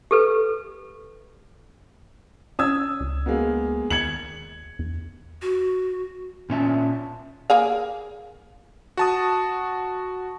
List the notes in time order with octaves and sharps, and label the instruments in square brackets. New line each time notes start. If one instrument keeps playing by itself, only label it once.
[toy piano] G4 A4 B4
[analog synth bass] C#4 [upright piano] D#6 E6 G#6
[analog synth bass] C#2
[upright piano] G#3 A#3 B3
[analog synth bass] D#2 [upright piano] G#6 C#7 F#7
[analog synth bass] E2
[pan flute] F#4
[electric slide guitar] A#2 C#4 E5 A5
[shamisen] A#3 G#4 F5
[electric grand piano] F#4 A5 D#6